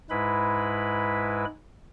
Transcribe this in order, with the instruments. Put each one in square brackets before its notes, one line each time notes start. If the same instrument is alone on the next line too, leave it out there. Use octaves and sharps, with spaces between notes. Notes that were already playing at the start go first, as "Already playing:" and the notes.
[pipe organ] G#2 G#3 E4 B4 B5